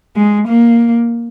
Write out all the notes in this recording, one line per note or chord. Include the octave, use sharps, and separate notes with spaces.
G#3
A#3